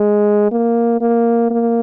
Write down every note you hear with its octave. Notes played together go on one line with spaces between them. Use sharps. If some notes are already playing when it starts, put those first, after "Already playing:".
Already playing: G#3
A#3
A#3
A#3